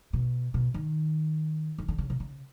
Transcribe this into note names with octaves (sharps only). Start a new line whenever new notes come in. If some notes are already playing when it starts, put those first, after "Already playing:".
B2
B2
D#3
D#3
D3
C#3
C3
C#3